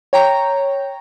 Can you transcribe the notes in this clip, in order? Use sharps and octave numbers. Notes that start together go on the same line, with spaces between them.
C#5 G5 A#5